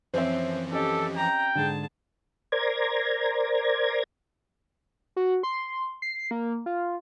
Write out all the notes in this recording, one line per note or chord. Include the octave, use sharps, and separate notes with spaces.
F#2 E3 F3 C4 C5 C#5 E5
C#4 G4 A4 D#5
G5 A#5
G#2 D3 G#4 A5
A#4 C5 D5 A#5 G#6
F#4
C6
C7
A#3
F4